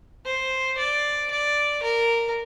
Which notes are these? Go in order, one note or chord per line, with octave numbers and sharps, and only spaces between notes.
C5
D5
D5
A#4